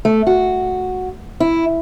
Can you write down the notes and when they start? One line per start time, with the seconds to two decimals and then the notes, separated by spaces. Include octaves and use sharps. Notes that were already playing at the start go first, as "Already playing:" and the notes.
0.05 A3
0.27 F#4
1.40 E4